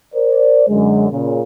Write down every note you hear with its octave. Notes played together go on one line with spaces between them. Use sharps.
A#4 C5 D5
F#2 D3 G#3
A#2 C#3